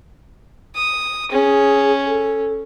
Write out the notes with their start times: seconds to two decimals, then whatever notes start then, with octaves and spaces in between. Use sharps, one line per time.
0.76 D#6
1.32 C#4 G#4
2.06 A4